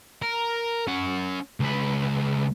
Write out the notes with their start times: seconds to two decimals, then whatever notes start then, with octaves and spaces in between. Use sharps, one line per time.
0.22 A#4
0.88 C#4 F#5
1.60 C#2 B4